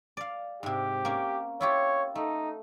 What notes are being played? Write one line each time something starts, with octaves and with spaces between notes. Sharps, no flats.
D5 F5
G#2 C3 G4
A#3 C#4
E4 F4 G4 C#5
A3 D#4